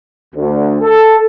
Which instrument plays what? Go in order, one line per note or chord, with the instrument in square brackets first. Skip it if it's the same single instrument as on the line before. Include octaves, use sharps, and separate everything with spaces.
[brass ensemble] D2
A4